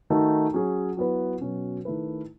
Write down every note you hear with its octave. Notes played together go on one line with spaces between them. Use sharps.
D#3 A3 D#4 F#4 A4
F#3 C#4 G#4
F#3 B3 E4 B4
B2 F#3 C#4
D#3 A3 E4 B4